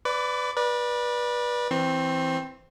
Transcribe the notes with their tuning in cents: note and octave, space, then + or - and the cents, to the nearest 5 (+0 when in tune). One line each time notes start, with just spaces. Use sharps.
B4 +15 D5 +0 D6 -30
B4 -25 D5 +15
E3 +0 C4 +0 C6 +45